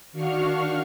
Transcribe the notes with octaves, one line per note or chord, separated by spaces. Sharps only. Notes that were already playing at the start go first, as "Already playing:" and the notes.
D#3 D4 F#4 F5 C#6 F6